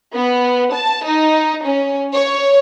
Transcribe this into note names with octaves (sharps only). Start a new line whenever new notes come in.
B3
A5
D#4
C#4
C#5